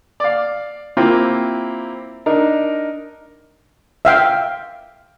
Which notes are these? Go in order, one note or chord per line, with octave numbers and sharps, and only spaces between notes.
D5 F5
A#3 C4 E4 F4 G4
D4 D#4 A#4
E5 F5 G5